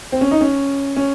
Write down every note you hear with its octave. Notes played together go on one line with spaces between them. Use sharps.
C4
C#4
D#4
C#4
C#4